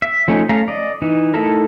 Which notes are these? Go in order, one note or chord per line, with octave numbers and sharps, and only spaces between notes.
E5
F3 A3 C#4 D#4
A3 C#4 F5 A#5
D5 D#5
E3 D#4
A3 D#4 E4 A4 A#4